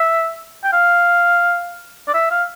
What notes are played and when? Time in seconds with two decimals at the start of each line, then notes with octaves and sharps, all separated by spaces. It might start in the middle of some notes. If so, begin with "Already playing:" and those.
Already playing: E5
0.64 G5
0.72 F5
2.08 D5
2.14 E5
2.31 F5